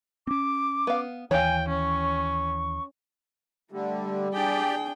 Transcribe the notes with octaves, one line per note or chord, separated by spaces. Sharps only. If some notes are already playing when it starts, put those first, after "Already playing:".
C4 C#4 D6
B3 F5
D#2 E3 C#5 F5 G5 G#5
C#4 C#6
D3 G3 A3
D4 G4 G#4 D5 G5